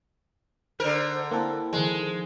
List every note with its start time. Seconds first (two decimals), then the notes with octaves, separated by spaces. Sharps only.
0.80 D3 A#4 C5
1.31 A#3 C4 E4 A4
1.73 D#3 F3 G#3